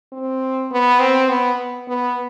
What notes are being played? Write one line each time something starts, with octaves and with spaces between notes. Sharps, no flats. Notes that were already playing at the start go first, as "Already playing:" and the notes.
C4
B3
C4
B3
B3